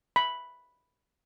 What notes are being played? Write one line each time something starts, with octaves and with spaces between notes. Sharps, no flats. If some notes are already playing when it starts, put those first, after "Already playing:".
B5